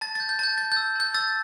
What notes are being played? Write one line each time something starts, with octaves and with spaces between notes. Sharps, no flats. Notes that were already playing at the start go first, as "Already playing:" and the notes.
A5 A6
G6 A6
G6
A5 G6 A6
G6 A6
E6 G6
A5 G6
E6 A6